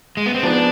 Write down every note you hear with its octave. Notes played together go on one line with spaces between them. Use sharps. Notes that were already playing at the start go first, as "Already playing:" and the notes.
G#3
B3
C4
F3 B3 D4 D#4 G#4